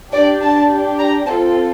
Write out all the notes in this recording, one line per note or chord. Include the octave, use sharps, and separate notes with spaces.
D4 G4 D5
A5
D4 G4
A#5
C4 F4 A4 A5